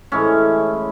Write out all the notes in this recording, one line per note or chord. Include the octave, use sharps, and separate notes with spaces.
A2 E3 G#3 C#4